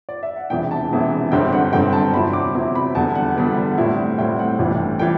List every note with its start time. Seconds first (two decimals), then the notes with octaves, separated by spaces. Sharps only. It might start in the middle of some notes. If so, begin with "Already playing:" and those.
0.09 D5
0.23 E5
0.36 F#5
0.50 E1 E2 C3 E3 G5
0.71 A5
0.91 E1 E2 C3 E3
1.32 G1 G2 D3 G3 C4 G5
1.53 F#5
1.73 G1 G2 D3 G3 C4 G5
1.93 A5
2.14 E2 C3 F#3 C4 E4 B5
2.33 D6
2.54 E2 C3 F#3 C4 E4
2.75 B5
2.95 E2 D3 G3 B3 A5
3.15 F#5
3.36 E2 D3 G3 B3
3.78 A2 G3 C4 E4
4.18 A2 G3 C4 E4 G5
4.39 F#5
4.59 A1 A2 E3 G3 D4
4.99 E3 G3 D4 G5